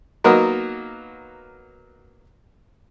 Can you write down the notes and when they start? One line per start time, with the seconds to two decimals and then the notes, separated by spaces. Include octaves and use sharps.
0.24 F#3 A#3 B3 D#4 F#4 A#4